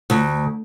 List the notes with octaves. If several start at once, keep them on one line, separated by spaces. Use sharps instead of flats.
D2